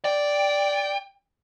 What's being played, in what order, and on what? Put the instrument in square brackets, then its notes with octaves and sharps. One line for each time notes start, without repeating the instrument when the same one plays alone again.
[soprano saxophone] D5 [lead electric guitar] G5